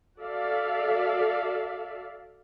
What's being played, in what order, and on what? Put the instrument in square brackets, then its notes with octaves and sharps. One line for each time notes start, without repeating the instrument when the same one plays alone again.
[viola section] F#4 A4 D5 E5 F5